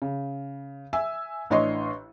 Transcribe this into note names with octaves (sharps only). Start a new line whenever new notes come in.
C#3
E5 G#5 E6
A1 D4 C#5 D#5 C6 C#6